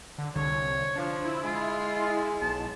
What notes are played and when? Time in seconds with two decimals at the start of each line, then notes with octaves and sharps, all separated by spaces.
0.18 D3
0.35 C2 D3 C#5
0.95 F3 D4
1.25 E4
1.43 G#3 F4
2.41 B1 A5